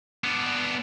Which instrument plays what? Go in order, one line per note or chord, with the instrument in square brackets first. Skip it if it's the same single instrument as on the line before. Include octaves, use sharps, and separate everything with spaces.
[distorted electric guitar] B3 D4